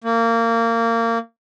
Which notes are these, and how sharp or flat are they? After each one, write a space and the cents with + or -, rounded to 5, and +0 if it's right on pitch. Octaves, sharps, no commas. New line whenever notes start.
A#3 -25